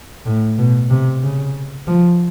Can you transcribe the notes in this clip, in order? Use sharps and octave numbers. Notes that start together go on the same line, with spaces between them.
A2
B2
C3
C#3
F3